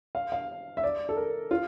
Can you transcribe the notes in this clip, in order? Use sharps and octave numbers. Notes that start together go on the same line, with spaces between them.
F5
F5
E5
D5
A4
A#4
F4